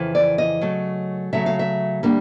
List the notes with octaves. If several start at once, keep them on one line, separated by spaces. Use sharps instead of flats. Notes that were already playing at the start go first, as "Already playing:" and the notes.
Already playing: F2 C#3 E3
D5
D#5
C#3 F#3 A3
C#3 F#3 A3 E5
F5
E5
D3 G3 A#3 D4